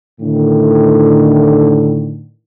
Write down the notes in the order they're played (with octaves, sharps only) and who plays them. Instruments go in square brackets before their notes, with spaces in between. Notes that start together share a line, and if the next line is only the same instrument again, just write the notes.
[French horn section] A2 D3 D#3